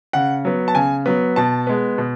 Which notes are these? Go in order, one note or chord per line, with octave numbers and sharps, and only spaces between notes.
C#3 F#5
F#3 B3
A5
C#3 G#5
F#3 B3
B2 A5
G#3 B3
B2